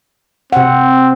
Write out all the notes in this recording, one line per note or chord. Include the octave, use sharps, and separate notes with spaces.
C3 C4 F#5